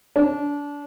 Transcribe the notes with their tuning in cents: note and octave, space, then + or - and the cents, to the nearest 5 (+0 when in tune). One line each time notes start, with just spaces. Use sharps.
D4 -25